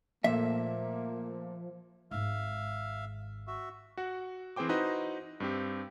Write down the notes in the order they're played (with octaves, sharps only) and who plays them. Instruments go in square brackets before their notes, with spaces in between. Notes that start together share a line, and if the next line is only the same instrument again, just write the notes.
[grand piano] A#2 A3 [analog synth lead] F3 [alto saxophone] A#3 [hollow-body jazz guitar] E5
[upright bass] G#1 G#2 [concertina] E5 F5
[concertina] F#4 E5
[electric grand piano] F#4 F#5
E3 C4 G#4 C5 G5 D6
D#4 E4 F#4 B4 C5 D#5
G2 C4 G4